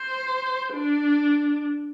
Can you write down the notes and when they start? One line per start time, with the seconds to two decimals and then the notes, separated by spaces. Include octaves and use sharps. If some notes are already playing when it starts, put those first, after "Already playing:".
Already playing: C5
0.73 D4